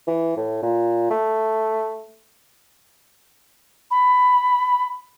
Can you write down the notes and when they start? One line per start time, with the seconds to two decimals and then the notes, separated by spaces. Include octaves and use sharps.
0.08 E3
0.37 A2
0.62 A#2
1.11 A3
3.90 B5